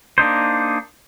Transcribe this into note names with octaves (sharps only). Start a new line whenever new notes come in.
A#3 D4 D#4 C5